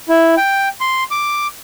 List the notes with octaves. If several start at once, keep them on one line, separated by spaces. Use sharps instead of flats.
E4
G5
C6
D6